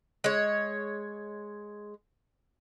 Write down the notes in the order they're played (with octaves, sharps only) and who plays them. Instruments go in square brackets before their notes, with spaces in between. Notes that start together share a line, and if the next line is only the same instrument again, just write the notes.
[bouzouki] G#3 C#5